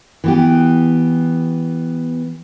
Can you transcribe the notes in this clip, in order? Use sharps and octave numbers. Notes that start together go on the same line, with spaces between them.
E3 B3 G4